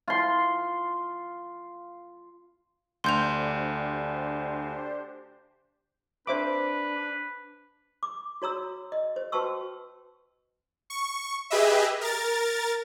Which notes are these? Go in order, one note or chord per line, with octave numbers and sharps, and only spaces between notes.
F4 C6
D2 D4 G4 C5 C6 G6 F7
D4 B4 C5 E5 D6
D6
F#4 C#5 A#5 E6
D#5
C5
F#4 B4 G5 A5 C#6 E6
C#6
G4 G#4 B4 D#5 E5
A#4 A6